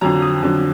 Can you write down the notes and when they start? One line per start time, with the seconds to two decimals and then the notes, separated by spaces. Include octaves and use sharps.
0.01 F2 D3 F#3 A#5
0.22 D#6
0.42 F2 D3 F#3